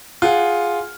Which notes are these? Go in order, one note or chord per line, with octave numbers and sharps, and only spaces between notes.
F4 G#4 F#5